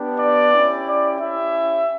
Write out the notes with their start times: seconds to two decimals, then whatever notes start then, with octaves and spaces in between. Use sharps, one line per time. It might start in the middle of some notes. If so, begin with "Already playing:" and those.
Already playing: B3 D4 G4
0.19 D5
0.53 C#4 E4 G4
0.86 D5
1.20 C#4 E4 G4 E5